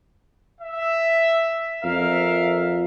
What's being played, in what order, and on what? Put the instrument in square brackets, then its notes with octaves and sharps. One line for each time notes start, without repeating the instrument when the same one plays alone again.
[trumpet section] E5
[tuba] F2 [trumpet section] A#4 E5 F5